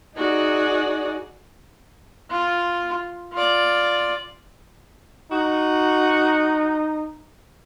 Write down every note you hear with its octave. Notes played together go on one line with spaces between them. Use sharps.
D#4 F#4 G#4 D5
F4
F4 D5
D#4 F#4